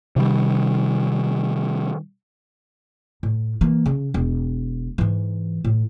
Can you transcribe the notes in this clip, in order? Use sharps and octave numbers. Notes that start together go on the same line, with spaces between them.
C3 D#3 G3
A2
E3 A#3
C#3
E1
G#2 E3
A2